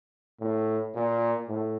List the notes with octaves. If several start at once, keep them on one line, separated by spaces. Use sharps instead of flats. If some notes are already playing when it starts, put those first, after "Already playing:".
A2
A#2
A2